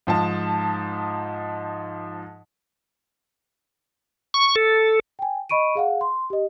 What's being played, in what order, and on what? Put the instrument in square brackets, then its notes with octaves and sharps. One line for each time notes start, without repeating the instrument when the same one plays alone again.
[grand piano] G#2 F3 D#4 A5
[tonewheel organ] C#6
A4
[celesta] G5 G#5
D#5 B5 C#6 D7 D#7
G#4 F5 F#5
C6
G4 D#5